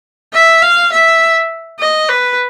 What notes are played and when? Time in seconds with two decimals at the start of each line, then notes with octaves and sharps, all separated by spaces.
0.33 E5
0.62 F5
0.92 E5
1.79 D#5
2.09 B4